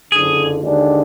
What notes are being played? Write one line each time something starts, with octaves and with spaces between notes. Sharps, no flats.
F#1 F2 D3 G#4
D#2 D3 G#3 D4